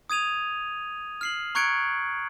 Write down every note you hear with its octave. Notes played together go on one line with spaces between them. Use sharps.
D#6 G#6 D#7 F7
F6 C7 F#7
A#5 C#6 F#6 G#6 C#7 D7